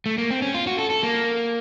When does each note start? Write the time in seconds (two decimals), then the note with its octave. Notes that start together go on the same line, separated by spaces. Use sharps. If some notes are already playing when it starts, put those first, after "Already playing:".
0.06 A3
0.18 A#3
0.30 C4
0.42 C#4
0.54 F4
0.67 F#4
0.79 A4
0.90 A4
1.03 A#3